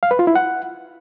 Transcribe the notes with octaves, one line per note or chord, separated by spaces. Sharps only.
F5
B4
F4
E4
F#5